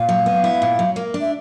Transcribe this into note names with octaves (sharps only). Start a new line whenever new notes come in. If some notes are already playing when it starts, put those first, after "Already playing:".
Already playing: A#2 F5
F#3
B3
E4
A#2
F#3
A#3
D4
E5